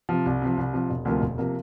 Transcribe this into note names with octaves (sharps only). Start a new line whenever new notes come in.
C3 F3
C2
C3 F3
C2
C3 F3
E1
D2 C3 F3 A#3
E1
C3 F3 A#3